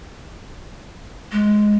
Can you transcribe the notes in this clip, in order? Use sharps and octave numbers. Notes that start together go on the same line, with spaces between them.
G#3